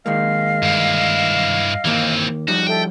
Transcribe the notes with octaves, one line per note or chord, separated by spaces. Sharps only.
D#3 G#3 A#3 D#5 F5 F6
G2 E4
D#2 E3 A#3 C4
F3 G3 D#4 F#4
A4 E5 G5